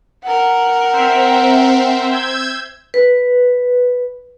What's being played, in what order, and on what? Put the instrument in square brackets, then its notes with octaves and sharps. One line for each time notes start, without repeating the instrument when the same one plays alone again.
[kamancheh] A#4 F#5
[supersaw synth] C4 C5 E5
E6 G6 G#6
[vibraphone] B4